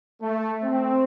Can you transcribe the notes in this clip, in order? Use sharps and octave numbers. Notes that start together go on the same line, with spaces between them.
A3
C4